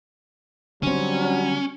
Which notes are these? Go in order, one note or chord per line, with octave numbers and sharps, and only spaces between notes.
D3 F#3 G3 C4 C#4